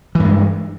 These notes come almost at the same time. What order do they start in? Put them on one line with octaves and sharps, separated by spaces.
E3 G2 G#3